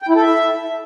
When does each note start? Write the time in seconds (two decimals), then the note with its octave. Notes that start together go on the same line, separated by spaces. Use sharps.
0.02 G5
0.09 E4
0.15 A4
0.22 E5